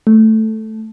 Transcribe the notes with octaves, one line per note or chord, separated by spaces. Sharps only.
A3